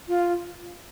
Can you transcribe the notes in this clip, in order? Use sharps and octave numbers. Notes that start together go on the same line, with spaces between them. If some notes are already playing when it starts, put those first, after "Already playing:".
F4